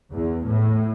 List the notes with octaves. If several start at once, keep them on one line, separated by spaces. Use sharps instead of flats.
E2
A2